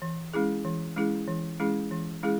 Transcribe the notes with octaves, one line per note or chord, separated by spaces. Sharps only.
E3
G#3 C#4 E4 G#4
E3
G#3 C#4 E4 G#4
E3
G#3 C#4 E4 G#4
E3
G#3 C#4 E4 G#4